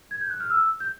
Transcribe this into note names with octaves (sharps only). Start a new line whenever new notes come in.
G#6
G6
F#6
F6
E6
G6